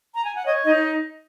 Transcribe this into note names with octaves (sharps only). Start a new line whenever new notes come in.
A#5
G#5
F#5
C#5 D#5
D#4 D#5